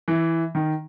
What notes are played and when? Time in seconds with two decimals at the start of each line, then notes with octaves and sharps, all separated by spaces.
0.08 E3
0.55 D#3